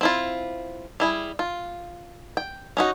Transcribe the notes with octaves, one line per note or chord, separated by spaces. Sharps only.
C4 E4 F4
G3 E4 G#4
F4
G5
C#4 D#4 F#4